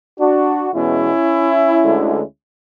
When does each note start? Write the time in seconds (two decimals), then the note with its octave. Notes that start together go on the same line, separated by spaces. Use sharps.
0.19 D4 F#4
0.73 E2 B2 G#3 C#4 E4
1.83 D2 D3 G#3